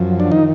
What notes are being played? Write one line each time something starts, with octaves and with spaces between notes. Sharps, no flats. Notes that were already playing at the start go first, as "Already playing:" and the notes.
Already playing: F#2 F3
D4
D#3 D#4